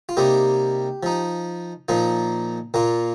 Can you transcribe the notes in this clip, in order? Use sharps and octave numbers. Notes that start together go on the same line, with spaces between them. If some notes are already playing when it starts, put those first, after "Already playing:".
F4
C3 G3 A#3 D#4 G4
F3 D#4
A#2 F3 A#3 D#4
A#2 A#3 F4